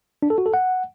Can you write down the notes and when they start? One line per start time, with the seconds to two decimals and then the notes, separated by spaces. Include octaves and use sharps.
0.23 D4
0.30 A4
0.38 F#4
0.46 A4
0.54 F#5